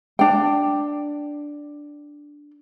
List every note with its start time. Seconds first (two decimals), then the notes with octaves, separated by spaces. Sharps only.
0.19 D4 G5